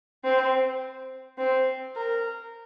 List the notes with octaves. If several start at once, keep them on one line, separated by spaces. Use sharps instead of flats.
C4
C4
A#4